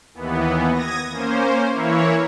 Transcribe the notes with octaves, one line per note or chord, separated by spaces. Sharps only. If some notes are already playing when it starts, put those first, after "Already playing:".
D#2 E3 B3
D#6 G#6 A#6
A#3 C#4 C5
E3 A#3 E4 C#5